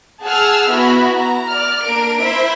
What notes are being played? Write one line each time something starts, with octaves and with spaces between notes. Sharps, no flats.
G#4 F#5 A5 E6 F6
B3 E4 F#4 B5
A#5
D5 F6
A#3 D4 A#4 D7
E4 C5 E5